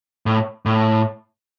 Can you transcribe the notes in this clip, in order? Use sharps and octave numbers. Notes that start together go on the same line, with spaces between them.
A2
A2